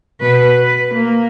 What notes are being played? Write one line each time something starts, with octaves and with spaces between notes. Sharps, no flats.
B2 B4
B4
A#3